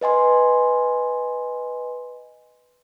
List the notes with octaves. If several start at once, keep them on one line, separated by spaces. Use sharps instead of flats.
B4 D#5 G#5 C6